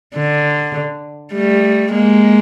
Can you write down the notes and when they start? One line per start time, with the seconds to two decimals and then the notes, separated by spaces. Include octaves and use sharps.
0.15 D3
1.34 G3 A3
1.92 G#3 A#3